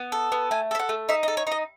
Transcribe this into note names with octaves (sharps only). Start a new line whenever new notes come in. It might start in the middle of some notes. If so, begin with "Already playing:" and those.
Already playing: B3
A4
B3
A3 G#5
A4 E5
F#5
A3
D#4 E5
D#5
A4
C#5
D#4 D#5